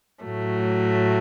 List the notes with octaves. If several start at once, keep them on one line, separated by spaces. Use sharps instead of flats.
A2 F#3 A3